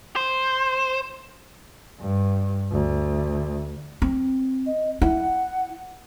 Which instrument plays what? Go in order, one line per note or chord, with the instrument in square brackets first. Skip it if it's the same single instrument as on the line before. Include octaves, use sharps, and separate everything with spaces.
[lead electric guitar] C5
[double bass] G2
D2
[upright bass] C4
[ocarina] D#5
[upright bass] E4 [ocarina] F#5